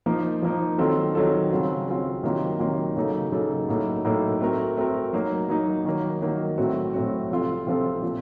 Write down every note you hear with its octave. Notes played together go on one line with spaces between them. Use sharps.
F3 A#3 D#4
F3 A#3 D#4
D#3 F#3 C4 F4 A4
D#3 F#3 C4 F4 A4
C#3 F#3 C4 F4
C#3 F#3 C4 F4
C3 D#3 F#3 A#3 F4
C3 D#3 F#3 A#3 F4
C#3 F#3 A#3 D#4 A4
C#3 F#3 A#3 D#4 A4
A2 F#3 A#3 D#4 A4
A2 F#3 A#3 D#4 A4
A3 C4 F#4 A#4
A3 C4 F#4 A#4
F#3 A#3 D#4
F#3 A#3 D#4
D#3 F#3 A#3
D#3 F#3 A#3
A2 F#3 A3 C4 F#4
A2 F#3 A3 C4 F#4
C3 F3 C4 F4 A4
C3 F3 C4 F4 A4
A#2 F3 C4